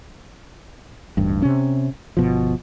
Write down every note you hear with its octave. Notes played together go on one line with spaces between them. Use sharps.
D1 A1 G2
C3 C#4
G1 B2 F3